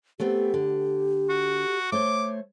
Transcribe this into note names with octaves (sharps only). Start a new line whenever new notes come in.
A3 B3 C4 G4
D3
F#4
A3 C5 C#5 D6